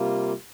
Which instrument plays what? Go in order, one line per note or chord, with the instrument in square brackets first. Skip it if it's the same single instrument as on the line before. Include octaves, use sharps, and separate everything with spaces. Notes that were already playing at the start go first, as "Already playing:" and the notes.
Already playing: [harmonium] C3 G3 A#3 F4